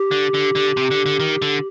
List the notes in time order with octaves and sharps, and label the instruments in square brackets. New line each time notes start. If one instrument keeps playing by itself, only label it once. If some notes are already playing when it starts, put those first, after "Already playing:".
Already playing: [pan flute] G4
[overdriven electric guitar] D3
D3
D3
C3
D3
D3
D#3
D3